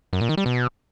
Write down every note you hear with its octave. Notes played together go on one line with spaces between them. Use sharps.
F#2
A#2
D#3
G3
B2